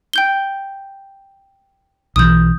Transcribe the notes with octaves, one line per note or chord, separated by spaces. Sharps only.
G5 G6 G7
B1 D#3 E3 D#6 G6